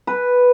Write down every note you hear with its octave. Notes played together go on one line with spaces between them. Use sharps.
B4